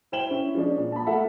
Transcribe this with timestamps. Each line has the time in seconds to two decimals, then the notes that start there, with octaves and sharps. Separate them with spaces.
0.12 E4 C5 G5 E7 F#7 G7
0.31 C#4 E4
0.55 F3 G#3 C#4 D4
0.78 A#2
0.92 A5 B5
1.07 A3 A#3 F4 A4 E5 F#5